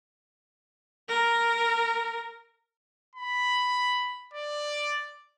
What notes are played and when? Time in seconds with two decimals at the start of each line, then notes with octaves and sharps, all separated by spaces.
1.08 A#4
3.16 B5
4.34 D5